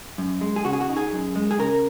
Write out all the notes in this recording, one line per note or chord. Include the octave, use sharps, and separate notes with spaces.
F#2
G#3
G#4
C#3 F#4
G#4
F#4
D#4
G#4
F#2
G#3
G#4
C#3 A#4